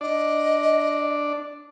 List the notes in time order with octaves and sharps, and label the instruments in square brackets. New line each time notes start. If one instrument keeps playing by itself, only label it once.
[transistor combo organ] D4 D5 [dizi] D#5